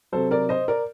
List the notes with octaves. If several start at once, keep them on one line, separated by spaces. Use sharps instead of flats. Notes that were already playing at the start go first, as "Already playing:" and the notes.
C3 F#3 A4 C5
A#4 D5
C5 D#5
A#4 D5